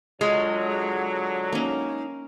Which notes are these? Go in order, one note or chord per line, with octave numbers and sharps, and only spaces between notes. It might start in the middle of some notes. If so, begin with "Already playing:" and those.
D3 F#3 G#3 F4 G#4 C#5
A#3 C#4 D#4